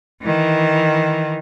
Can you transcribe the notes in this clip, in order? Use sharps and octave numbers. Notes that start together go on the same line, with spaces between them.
D#3 E3